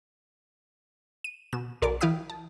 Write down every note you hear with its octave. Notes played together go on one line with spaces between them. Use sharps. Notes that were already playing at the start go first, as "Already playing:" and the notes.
D#7
B2 E7
B1 A#4 D5 D6
E3 E4 F5 G5 D#6 B6
A5